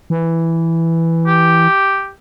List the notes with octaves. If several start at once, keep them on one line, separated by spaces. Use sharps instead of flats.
E3
G4